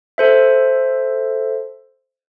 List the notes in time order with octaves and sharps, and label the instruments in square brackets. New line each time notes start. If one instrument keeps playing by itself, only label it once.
[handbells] A4 C5 E5